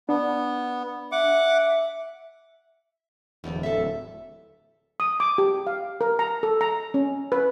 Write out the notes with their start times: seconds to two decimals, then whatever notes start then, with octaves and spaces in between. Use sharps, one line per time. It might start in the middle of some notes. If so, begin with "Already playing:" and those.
0.09 B3 D4
1.12 E5 F#5 D6
3.44 D1 E2
3.63 A4 E5
5.00 D#6
5.20 D6
5.38 G4
5.67 F5
6.01 A#4
6.19 A#5
6.43 A4
6.61 A#5
6.94 C#4
7.32 B4